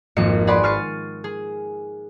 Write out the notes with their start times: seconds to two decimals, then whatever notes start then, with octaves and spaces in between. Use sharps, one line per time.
0.17 G#1 F2 A#3 C#7
0.47 G#4 B4 D5 F#5 B5 C6
0.63 C#6 F6 A6 C7 D#7
1.24 G#4